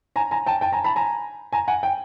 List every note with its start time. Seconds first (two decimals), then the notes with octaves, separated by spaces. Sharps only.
0.16 G#5 A#5
0.31 G#5 A#5
0.46 G5 A5
0.61 G5 A5
0.72 G#5 A#5
0.84 A5 B5
0.96 G#5 A#5
1.53 G#5 A#5
1.68 F#5 G#5
1.83 G5